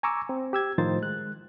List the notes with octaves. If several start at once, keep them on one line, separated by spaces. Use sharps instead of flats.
G#5 A#5 C#6 D6 E6
C4
G4 E6 G#6
A2 D#3 F3 D#4 C5 A6
G#3 F#6